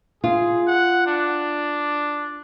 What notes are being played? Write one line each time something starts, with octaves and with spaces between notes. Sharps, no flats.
F4 G#4
F#5
D4